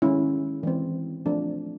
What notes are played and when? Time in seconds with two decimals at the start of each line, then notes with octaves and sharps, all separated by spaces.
0.02 D#3 G#3 C#4 E4
0.63 E3 G#3 C4
1.26 F3 A3 C4 D4